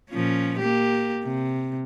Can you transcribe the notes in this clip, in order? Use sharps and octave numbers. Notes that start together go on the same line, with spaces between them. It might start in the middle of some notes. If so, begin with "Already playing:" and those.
A#2 F3 C#4
A#3 G4
C3